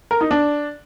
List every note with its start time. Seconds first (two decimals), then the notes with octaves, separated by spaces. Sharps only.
0.11 A#4
0.21 D#4
0.31 D4